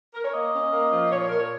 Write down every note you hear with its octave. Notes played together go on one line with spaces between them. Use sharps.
A#4
C#5
A#3 D#5
C#4
A#3
F3
A#2 C#5
C#5
A#2 A#4
C#5